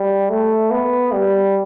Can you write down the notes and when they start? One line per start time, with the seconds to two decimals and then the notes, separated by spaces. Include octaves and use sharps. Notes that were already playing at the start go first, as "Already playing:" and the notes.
Already playing: G3
0.29 A3
0.71 B3
1.12 G3